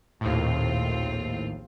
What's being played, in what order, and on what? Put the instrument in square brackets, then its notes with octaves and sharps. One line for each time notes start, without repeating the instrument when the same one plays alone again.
[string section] A#1 C4 F4 [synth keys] D#2 A2